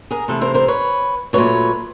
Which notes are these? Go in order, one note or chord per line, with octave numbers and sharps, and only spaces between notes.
G#4 A#4
C3 E3 A3 A4 B4
A#4 C5
A#4 C5
B4 C#5
A#2 F#3 A3 B4 C#5